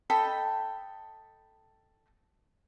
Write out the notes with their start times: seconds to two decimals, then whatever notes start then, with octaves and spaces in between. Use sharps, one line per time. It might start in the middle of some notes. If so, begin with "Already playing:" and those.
0.10 A4 D#5 G5 B5